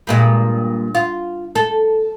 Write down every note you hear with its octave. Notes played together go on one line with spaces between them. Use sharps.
G2 A#2 G#3
F4
A4